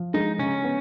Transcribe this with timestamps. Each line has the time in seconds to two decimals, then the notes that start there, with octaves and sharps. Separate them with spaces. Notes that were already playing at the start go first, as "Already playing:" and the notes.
Already playing: F3
0.14 G#3 D#4
0.39 C#3 C#4
0.64 B3